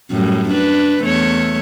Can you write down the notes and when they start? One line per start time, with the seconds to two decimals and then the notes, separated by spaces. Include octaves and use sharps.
0.11 F#2 A2 G3
0.49 D4 B4
1.02 E2 A3 C#5